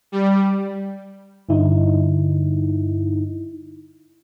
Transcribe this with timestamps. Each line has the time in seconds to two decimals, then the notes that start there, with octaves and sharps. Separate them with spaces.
0.12 G3
1.49 G2 D3 D#4 E4